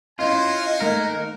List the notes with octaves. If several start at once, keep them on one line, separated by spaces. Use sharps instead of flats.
C#4 E4 F4 C5 D#5 F#5 G#5
D#3 A3 A#3 A#4